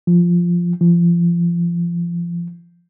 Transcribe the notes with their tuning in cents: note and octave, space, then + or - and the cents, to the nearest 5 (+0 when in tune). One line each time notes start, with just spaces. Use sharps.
F3 -5
F3 -30